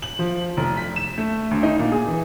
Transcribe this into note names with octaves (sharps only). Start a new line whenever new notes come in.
F#7
F3
F1
B6
E7
A3
D2
D#4
A#2
G#4
E3